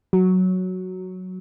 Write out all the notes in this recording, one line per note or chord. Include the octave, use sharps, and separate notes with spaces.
F#3